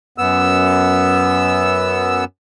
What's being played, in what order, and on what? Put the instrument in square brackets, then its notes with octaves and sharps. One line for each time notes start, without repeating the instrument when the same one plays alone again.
[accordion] F#2 B3 E6